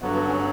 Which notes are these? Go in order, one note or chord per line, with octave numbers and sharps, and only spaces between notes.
G2 D3 F#3 B3
B3
C#4